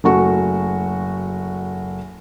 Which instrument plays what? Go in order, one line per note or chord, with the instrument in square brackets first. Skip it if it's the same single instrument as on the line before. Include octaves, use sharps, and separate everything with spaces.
[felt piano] F#1 A3 F#4 C#6